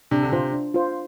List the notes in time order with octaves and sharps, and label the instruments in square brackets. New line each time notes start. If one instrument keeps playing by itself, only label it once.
[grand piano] C3 [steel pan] D4
[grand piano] D3
[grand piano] C3 [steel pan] F4 C5
[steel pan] D4
F4 C5